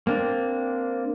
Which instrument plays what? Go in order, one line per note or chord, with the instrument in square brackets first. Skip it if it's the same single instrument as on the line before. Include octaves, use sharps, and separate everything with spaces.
[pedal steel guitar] A#3 C4 D4